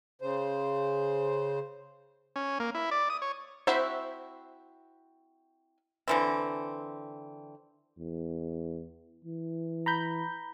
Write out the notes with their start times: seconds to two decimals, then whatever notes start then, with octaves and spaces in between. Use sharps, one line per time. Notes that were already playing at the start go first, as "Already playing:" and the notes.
0.22 C#3 C5
2.36 C#4
2.60 A#3
2.75 E4
2.91 D5
3.10 D#6
3.22 C#5
3.67 C4 E4 F#4 C5 E5
6.08 D3 E3 C4
7.99 E2
9.25 E3
9.86 A#5 B5 G6